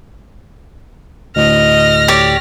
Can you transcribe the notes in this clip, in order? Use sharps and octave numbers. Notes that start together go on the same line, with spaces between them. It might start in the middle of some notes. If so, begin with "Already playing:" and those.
D2 A2 D#5 F6 A#6
G4 C#5 D5